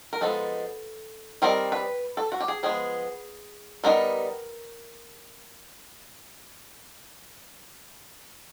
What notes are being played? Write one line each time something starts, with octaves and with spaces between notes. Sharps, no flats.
A#4
F3 G#3 B3 D#4 A4
G3 C4 D#4 A#4
B4
A4
F#4
G4
G#4
F3 G#3 B3 G#4
G3 B3 D#4 A#4